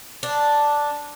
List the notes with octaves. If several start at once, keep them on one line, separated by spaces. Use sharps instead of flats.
D4